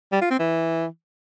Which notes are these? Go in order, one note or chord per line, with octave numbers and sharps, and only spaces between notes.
G3
F4
C4
E3